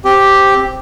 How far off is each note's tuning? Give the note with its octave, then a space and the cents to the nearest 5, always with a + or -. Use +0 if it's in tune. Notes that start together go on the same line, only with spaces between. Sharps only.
C4 +0 G4 +0